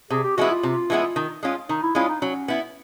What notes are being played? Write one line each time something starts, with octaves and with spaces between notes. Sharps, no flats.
C3 G#4
G4
E3 G#3 B3 E4 F#4
F4
C3
E3 G#3 B3 E4
D#3
G#3 C#4 F4
D#3 D#4
E4
G#3 C#4 E4 F4
D#4
F#3 C#4
B3 E4